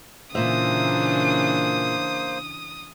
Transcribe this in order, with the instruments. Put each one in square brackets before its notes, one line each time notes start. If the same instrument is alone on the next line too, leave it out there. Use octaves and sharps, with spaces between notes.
[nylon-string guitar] A#2 E5 [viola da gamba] C#3 E3 D4 [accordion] A#3 C5 [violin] D#6